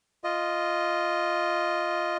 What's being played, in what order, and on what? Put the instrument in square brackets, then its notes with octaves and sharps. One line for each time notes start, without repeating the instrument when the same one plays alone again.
[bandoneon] F4 D#5